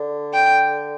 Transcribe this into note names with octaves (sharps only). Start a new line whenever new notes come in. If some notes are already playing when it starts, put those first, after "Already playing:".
Already playing: D3
G5